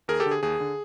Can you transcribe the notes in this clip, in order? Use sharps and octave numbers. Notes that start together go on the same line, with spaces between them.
D#2 G#4 A#4
G4 A4
D3
G#4
D#2 G#4
D3